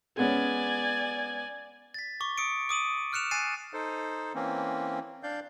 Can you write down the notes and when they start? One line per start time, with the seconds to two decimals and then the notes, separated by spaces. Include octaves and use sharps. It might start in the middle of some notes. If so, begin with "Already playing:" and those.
0.17 G#3 B3 C#4 D5 G#5
1.94 A6 B6
2.20 C#6 D6
2.38 D#6 C#7 D7
2.69 D6 D#6 D#7 F#7
3.12 D6 F6 F#6 C#7 E7 F7
3.31 G#5 F#6 A6 C7 D#7
3.73 D#4 A4 C5
4.35 E3 A#3 C4 C#4
5.23 D4 D5 F5 G6